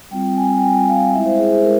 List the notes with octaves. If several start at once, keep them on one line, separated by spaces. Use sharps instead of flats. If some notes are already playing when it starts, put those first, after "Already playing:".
G3 C4 F4 G5
G#5
G5
G3 C4 F4 G#5
F5
G#3 C#4 E4 E5
C5
G#4
G#4
G#3 A#4